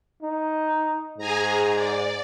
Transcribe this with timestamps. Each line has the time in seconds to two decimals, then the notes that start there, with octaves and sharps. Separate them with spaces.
0.22 D#4
1.18 G#2 G#4 G#5 A#5
1.74 D5